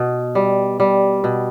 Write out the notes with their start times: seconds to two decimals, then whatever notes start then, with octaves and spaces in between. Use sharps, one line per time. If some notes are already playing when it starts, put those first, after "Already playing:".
Already playing: B2
0.35 G3
0.80 G3
1.24 B2